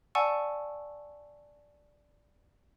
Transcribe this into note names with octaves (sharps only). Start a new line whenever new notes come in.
D5 F#5 G#5 A5 C#6 E6